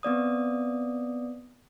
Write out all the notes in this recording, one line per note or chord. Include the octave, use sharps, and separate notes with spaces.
B3 C4 D5 D#6